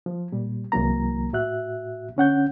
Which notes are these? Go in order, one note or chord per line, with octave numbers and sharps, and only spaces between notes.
F3
A#2 G3
C2 E3 F#3 A#3 A#5
A2 F#4 E5 F#6
D3 C#4 F#5 G6